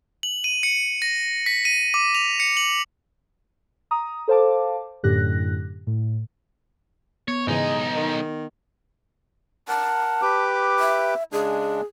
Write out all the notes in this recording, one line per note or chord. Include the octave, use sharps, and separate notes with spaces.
F#7
D#7
C#7
A#6
B6
D#7
D6
F7
C#7
F#7
A#5 D#6
A4 C5 F5 A5 D6
F#2 A2 D3 G4 F#6 A#6
A2
B3 C#5
B1 G#2 C#3 E3 G#3 D#4 D#5
D#3
A#4 F#5 A5
G4 B4 D6
E5
C#3 G#3 D4 G#4